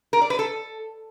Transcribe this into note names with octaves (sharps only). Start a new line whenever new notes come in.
A#4
D5
B4
A4